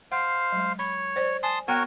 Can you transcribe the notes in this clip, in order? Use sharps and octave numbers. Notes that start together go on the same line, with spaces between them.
C5 F5 F#5
F#3 G#3
C#5 B5
C5 D5
G#5 A5 C6 D#6
B3 F#4 A#4 C#5 F#5 G5